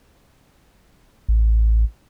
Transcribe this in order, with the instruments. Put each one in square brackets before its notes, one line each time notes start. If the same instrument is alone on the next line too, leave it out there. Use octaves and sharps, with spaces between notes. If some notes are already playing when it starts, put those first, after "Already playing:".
[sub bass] A1